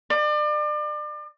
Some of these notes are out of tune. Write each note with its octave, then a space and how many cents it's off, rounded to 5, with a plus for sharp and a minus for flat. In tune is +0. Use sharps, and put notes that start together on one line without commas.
D5 +35